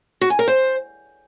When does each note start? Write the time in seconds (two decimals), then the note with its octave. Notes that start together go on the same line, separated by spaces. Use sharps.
0.21 F#4
0.30 G#5
0.39 A#4
0.48 C5